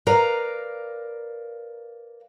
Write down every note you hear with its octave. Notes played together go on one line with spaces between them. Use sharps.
A#4 B4 D5 F5 A#5